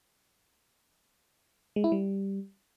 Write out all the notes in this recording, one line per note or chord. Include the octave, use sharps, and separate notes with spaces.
G#3
E4
G3